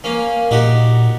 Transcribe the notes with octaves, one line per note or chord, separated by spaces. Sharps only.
A#3 C#4
A#2 D#4 F#4 G4